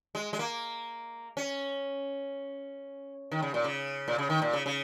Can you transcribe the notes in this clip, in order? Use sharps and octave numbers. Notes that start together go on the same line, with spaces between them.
G#3
G#3
A#3
C#4
D#3
C#3
A#2
C#3
A#2
C#3
D#3
A#2
C#3
C#3